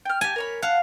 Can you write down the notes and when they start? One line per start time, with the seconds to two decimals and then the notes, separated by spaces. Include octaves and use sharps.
0.05 G5 F6
0.21 G4 G#5 A5
0.36 A#4 C#5 B5
0.62 A4 F5 F#5